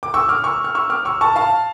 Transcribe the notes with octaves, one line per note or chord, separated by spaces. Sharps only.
D6
C#6 E6
D6 F6
C#6 E6
F6
C#6 E6
D6 F6
C#6 E6
A5 C#6
F5 A5